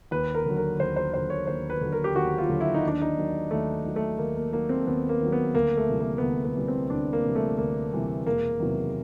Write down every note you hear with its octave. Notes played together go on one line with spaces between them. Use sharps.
D#2 B4
A#4
D3 F#3
A#4
D#2 C5
C5
D3 F#3 C5
C#5
D#2 C5
B4
D3 F#3
A#4
G4
D#2 F#4
F4
D3 F#3
E4
D#4
D#2 D4
D#4
D#3 F#3
D#2 A3
D#3 F#3
A3
D#2 A#3
A#3
D#3 F#3 A#3
C4
D#2 B3
A#3
D#3 F#3
B3
D2 A#3
A3
C3 E3 G3
A#3
B3
D2 A#3
B3
C3 E3 G3
C4
D2 D4
A#3
C3 E3 G3
A3
D2 A#3
C3 E3 G3
E1 A#3
E2 C3 D#3 F#3